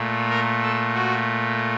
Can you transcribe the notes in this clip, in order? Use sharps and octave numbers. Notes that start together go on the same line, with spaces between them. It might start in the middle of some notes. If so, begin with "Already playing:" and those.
Already playing: A#2 A3
A#4
A4
F#4